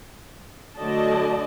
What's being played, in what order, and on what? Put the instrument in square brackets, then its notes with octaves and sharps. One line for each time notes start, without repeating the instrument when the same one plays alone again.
[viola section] D3 F#3 A3 D5 D#5 A5